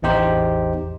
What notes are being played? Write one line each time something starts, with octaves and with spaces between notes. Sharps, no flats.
A1 E2 D#4 G4 C5